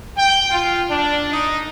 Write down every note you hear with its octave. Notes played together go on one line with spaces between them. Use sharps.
G5
F4
D4
D#4